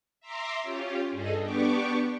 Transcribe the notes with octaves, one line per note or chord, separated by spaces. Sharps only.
E5 A#5 C6 D6
C#4 F4 G4
G2 G#4 A4 D#5
B3 D4 G4 C#6 D6